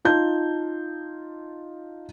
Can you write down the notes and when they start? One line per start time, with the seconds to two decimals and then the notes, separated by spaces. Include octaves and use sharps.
0.05 D#4 F4 A5 G6